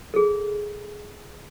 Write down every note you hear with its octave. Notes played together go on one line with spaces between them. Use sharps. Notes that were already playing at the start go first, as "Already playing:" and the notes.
G#4 A4